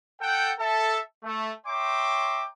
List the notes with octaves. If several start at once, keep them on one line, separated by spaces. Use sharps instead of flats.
A4 F#5 G5
A4 E5 A5
A3
C#5 E5 G5 A#5 C6 D6